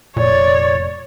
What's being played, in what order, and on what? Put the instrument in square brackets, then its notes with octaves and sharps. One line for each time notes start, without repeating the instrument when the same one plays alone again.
[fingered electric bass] F1 [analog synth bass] A#2 [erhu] C#5 [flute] D5